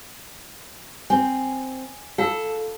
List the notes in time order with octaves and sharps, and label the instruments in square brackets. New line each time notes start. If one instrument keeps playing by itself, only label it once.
[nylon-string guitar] C4 [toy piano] G#5
[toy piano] F4 F5 E6 [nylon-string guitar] A4